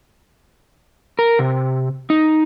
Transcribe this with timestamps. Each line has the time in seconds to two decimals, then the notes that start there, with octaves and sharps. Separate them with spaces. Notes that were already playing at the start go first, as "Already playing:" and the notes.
1.19 A#4
1.39 C3
2.10 D#4